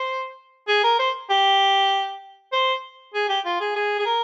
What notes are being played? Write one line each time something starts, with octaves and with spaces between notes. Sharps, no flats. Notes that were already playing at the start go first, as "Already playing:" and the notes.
Already playing: C5
G#4
A#4
C5
G4
C5
G#4
G4
F4
G#4
G#4
G#4
A#4